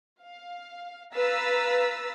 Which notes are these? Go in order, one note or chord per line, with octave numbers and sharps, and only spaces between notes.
F5
B4 F5 A#5 E6 A6 B6